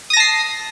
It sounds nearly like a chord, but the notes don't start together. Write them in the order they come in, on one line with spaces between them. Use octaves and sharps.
D#6 A#6 A5 C7